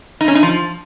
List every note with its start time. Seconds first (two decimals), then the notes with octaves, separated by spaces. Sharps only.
0.21 D#4
0.28 C#4
0.35 D#4
0.43 F3